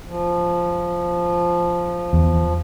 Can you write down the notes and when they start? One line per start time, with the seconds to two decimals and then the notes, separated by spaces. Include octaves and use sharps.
0.07 F3
2.13 E2